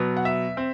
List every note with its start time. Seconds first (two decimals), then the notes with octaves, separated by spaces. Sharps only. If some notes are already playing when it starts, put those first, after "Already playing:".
Already playing: B2 F#3 B3
0.17 F#5
0.25 E5
0.57 C4